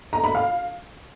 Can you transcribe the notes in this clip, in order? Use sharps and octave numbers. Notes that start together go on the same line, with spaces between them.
A#5
B5
F5